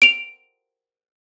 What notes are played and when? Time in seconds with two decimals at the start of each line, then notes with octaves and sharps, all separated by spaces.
0.02 D7 F7